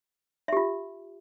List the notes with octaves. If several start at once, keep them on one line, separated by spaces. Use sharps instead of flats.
F4 G4 E5